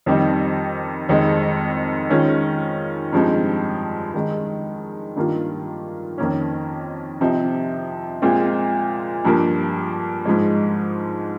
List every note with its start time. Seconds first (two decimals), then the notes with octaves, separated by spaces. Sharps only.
0.06 F2 D#3 G3 C4 D#4
1.09 F2 D#3 G#3 D#4
2.10 D#3 G#3 C#4 F4
3.12 G2 F3 G#3 C4 D#4
4.14 D#3 G#3 D#4
5.16 G2 D#3 A#3 F4
6.18 F2 D#3 A#3 C#4
7.21 C3 F3 C4 D#4
8.22 A#2 G#3 C4 F4
9.25 G2 F3 A#3
10.26 G#2 F3 G#3